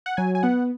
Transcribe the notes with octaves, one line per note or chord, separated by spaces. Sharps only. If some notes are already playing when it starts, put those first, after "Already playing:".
F#5
F#3 G#5
G#5
B3 F#5